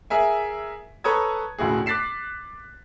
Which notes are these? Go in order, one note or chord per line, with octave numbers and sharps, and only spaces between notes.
G#4 A#4 E5 G#5
A4 B4 C#5 A#5 D#6 G#6
E1 C#2 A2 F#4 G#4
D6 F#6 A6 B6 C7 E7